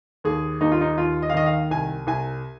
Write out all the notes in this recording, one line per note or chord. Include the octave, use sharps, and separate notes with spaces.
D#2 G#4
D#2 D#4
F4
D#4
D#2 F4
D#5
F5
D#3 D#5
F5
C2 G#5
C2 G#5